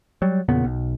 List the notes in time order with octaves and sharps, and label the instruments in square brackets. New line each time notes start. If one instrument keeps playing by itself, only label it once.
[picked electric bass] F#3 G3
E2 A#2 C#3 B3
B1